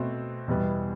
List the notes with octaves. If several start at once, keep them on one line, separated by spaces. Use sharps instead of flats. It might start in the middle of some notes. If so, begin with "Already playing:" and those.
Already playing: B2 A3 C4 F#4
E2 B2 G3 B3